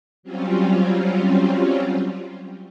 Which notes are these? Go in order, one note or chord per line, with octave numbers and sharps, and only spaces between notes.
F#3 G3 C4 C#4 F4